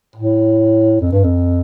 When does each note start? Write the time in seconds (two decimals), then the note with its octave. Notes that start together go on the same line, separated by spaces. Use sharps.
0.16 A2
1.00 F2
1.12 G2
1.24 F2